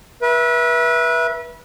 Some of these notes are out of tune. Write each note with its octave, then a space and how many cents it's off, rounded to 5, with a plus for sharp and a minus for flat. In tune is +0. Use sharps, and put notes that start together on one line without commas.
B4 -30 E5 +0